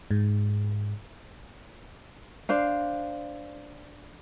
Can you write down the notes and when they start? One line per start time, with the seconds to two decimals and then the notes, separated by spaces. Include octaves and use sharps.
0.11 G#2
2.49 D4 C5 F5